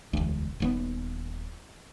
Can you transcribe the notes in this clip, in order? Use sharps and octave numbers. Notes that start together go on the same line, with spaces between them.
E1 D2
D#1 D#2 B3